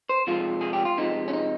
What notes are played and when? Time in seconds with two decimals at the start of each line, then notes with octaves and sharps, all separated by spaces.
0.09 C5
0.27 C3 F3 G#3 F4
0.61 G#4
0.73 G4
0.85 F4
0.98 C3 F3 G#3 D#4
1.28 C#4
1.33 D#4